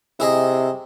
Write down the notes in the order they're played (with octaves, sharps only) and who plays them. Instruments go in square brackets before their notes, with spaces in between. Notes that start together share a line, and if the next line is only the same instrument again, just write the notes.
[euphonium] C3 [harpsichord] E4 G#4 D#5